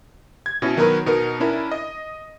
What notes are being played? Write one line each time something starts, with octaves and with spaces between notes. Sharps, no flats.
G#6
B2 C#4 E4
D#3 F#3 B3 F#4 A#4 B4
B2 B3 D#4 A#4
C#4 D4 E4 A#4
D#5